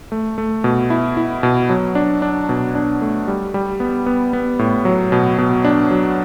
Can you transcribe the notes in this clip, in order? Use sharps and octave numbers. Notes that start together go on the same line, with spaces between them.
A3
A3
B2
E4
E4
B2
F#3
D4
D4
B2
D4
A3
G3
G3
B3
B3
B3
A2
F#3
B2
B2
D4
F#3